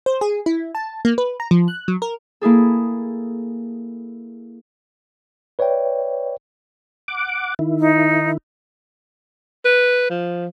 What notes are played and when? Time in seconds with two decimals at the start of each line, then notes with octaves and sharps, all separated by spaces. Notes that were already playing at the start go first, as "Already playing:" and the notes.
0.06 C5
0.21 G#4
0.46 E4
0.75 A5
1.05 A#3
1.18 B4
1.40 A#5
1.51 F3
1.68 F#6
1.88 F#3
2.02 A#4
2.41 A#3 E4 G#4 A4
5.59 B4 C#5 D5 E5 G5
7.08 F#5 D6
7.59 D#3 E4
7.79 D#4
9.65 B4
10.10 F3